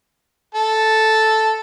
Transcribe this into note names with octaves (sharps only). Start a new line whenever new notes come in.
A4